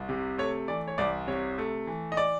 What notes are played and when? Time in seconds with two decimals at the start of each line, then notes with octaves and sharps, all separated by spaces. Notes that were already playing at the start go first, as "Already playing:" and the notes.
Already playing: C2
0.09 C3
0.38 A3 C#5
0.68 E3 D5
0.88 C#5
0.98 C2 D5
1.28 C3 C#5
1.58 A3
1.87 E3
2.12 D#5
2.17 D5